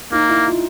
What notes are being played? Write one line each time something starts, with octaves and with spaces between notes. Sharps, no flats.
A#3 D#4
E4
F4